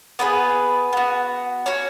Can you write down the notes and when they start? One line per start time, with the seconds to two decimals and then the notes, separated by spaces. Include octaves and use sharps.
0.19 B3 E4 G#4 B4
0.93 B3 F#4
1.66 C#4 F#4 C#5